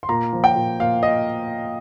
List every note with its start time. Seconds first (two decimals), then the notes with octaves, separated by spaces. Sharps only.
0.03 C6
0.09 A#2 A#5
0.33 F3
0.44 G5
0.55 A#2
0.80 A#2 F5
1.03 D#5